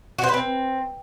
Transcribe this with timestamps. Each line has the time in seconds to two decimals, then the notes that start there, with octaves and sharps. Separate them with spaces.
0.19 F#4
0.24 C5
0.29 B4
0.34 C4